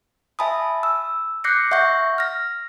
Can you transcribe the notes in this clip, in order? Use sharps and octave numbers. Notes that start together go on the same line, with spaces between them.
E5 G#5 A5 B5 D#6
E6
D6 F#6 G6 A#6 C7 C#7
E5 F#5 C#6 G6 A#6
F6 A#6